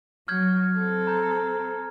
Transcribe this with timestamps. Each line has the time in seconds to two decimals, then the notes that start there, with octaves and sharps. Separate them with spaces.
0.28 F#3 F6 G6 G#6
0.75 C4 A4
1.07 A#5 G6